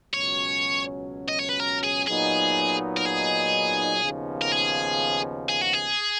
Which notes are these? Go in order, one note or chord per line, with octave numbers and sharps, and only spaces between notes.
C#2 B2 F#3 C#4 C#5
D#5
C#5
B4
A#4
G#4
A#2 F#3 B3 D#4 G#4
A#4
G#4
D#2 C#3 F3 B3 D#4
A#4
G#4
G#4
F#4
G#4